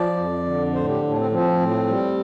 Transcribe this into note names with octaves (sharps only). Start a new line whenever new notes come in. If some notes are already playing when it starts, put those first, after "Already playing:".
Already playing: F3 D5
F2
D3
A2 C5
G4
A2
D4
C4
F3 C4
A2
G3